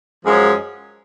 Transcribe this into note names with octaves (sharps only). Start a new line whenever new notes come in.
F#2 F3 G#3 C#4